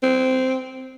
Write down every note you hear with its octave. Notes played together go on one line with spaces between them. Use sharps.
C4